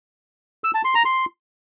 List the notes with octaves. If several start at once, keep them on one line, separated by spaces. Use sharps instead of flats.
E6
A5
C6
A#5
C6